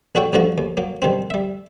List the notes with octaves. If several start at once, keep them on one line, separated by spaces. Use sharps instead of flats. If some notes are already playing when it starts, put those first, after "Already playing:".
A#1 D4 F#4 A4 C#5 G5
A1 G2 F3 A3 F#4 A#5
D#2
F#3 A#3
B1 D#3 G3 C4
G3 E5